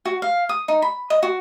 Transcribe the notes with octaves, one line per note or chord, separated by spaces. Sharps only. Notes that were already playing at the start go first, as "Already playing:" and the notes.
F#4
F5
D#6
D#4
B5
D#5
F#4